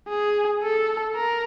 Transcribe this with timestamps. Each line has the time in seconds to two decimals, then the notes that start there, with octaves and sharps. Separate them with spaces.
0.09 G#4
0.63 A4
1.16 A#4